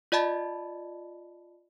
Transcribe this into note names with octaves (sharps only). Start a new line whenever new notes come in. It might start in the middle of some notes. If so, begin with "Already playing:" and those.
F4 D5 D#5 A5 B5 A6